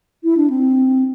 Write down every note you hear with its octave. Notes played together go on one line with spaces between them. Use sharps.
E4
D4
C4